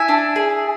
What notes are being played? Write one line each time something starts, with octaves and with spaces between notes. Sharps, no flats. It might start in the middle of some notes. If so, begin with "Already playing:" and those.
Already playing: E4 E5 G#5
D4
G#4